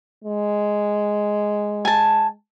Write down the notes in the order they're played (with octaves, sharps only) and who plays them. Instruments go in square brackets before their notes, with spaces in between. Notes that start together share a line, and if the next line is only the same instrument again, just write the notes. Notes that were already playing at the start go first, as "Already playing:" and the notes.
[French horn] G#3
[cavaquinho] G#5 A5